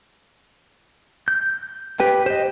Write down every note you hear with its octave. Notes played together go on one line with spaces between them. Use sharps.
G6
G4 B4 G5
C5 D#5